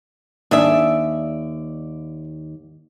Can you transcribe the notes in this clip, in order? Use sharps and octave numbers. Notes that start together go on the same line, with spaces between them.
D#2 D4 G#4 D5 E5